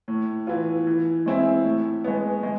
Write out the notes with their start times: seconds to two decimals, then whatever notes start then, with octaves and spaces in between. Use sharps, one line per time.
0.08 A2
0.47 E3 B3 F4
0.87 E3
1.26 G#3 C4 E4
1.64 A2
2.04 G#3 B3
2.43 G#3